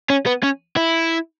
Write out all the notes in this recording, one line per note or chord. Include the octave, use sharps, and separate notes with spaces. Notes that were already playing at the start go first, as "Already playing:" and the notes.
C#4
B3
C#4
E4